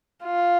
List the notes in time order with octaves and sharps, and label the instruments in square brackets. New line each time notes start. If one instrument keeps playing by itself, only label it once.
[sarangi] F4